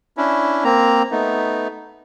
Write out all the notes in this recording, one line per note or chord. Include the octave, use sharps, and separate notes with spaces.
C#4 D4 E4
A#3 C4 A#5
A3 B3 D#4